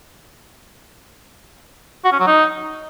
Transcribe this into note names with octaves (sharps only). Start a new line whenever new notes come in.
F#4
C#4
F#3
D#4